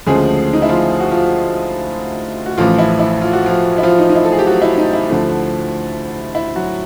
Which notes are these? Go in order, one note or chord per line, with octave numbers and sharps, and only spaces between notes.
D2 C#3 F3 G#3 A3 C4 G#4
D#4
E4
F3 F4
F#4
F3 F4
F#4
A1 A2 E3 F3 F4
E4
E4
F4
F#4
F3 F4
E4
F3 F4
D#4
D#4
E4
A4
G#4
G4
F#3 F#4
E4
D#4
E4
D2 D3 F3 A3
E4
F#3 F#4